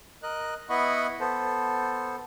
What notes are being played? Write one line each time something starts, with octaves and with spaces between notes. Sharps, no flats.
A#4 D#5 F#6
B3 E4 D#5 F#5 B5 C#6
B3 A4 C5